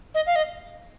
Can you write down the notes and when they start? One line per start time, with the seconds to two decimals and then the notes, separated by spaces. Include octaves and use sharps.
0.15 D#5
0.27 F5
0.36 D#5